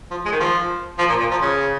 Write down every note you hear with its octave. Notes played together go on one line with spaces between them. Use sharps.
F3
G#3
D#3
F3
F3
A#2
A#2
F3
C#3